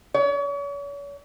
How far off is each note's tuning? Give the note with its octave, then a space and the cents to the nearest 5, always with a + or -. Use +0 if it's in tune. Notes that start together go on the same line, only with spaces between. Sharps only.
C#5 +40